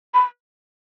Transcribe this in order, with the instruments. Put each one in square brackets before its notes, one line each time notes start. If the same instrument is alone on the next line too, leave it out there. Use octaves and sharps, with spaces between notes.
[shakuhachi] B5